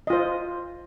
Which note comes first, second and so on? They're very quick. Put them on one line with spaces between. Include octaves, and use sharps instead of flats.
D#5 F4 C5